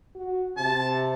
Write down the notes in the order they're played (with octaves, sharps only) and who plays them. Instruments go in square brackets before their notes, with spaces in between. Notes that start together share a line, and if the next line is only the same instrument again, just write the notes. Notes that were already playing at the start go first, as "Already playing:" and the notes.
[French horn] F#4
[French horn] C3 [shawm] A5